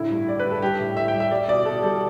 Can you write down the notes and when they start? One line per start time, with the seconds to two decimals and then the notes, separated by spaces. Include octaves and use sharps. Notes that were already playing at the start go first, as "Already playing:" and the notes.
Already playing: A2 D3 E4
0.10 G2
0.27 G3 D5
0.40 G2 B4
0.51 A4
0.62 G3 G4
0.79 A2
0.97 A2 E5
1.08 G5
1.14 G3
1.20 E5
1.31 G3 D5
1.48 B2 D5
1.65 B2 A4
1.83 G3 A4